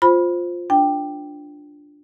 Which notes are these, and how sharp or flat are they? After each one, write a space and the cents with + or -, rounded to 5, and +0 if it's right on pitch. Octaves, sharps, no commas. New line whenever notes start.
F4 +10 C5 +0 B5 -10
D4 +0 G5 +0